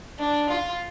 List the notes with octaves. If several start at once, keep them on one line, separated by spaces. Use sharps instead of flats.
D4
F4